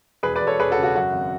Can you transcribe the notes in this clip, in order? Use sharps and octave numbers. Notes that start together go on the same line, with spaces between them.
E1 G#4 B4
B4 D5
E1
A4 C#5
E1 G#4 B4
F#4 A4
C#3
F#4
F#2 F#4
G#1